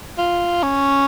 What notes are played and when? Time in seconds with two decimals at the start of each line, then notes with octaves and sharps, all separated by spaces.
0.18 F4
0.63 C#4